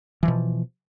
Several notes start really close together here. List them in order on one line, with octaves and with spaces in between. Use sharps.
E3 F3 B2